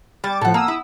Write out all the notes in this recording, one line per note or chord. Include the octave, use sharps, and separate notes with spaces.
G3 D6 A6
A2 F3 A4 F#5
A#3 D#6 E6
E4